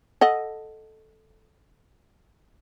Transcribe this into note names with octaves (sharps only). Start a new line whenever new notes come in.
A4 D#5 F#5